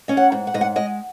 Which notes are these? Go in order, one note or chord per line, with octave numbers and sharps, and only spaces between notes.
C#4 D#5
F#5
G#2
F#5
G#2 D#5
F#5
G#3 D#5